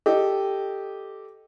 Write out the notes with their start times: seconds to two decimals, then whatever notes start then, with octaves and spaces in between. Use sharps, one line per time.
0.06 G4 A4 D#5